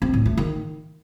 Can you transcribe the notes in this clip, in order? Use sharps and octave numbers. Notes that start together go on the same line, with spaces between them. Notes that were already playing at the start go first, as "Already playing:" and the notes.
C4
A2
A3
D#3